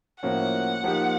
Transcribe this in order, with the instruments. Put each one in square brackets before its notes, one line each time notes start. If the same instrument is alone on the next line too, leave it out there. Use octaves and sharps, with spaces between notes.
[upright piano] A2 F3 A#3 C#4 F#4 [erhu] F#5
[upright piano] F3 A#3 D#4 G4 C5